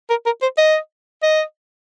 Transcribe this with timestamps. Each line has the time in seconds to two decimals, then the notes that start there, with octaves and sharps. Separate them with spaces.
0.10 A#4
0.26 A#4
0.42 C5
0.58 D#5
1.23 D#5